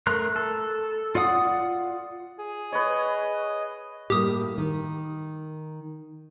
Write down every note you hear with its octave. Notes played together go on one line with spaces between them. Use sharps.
A3 A#4 A#5 C6 F#6
A4
F4 D5 F#5 D#6
G#4
B4 C#5 D#5
A2 G3 A#3 G4 D#6
D#3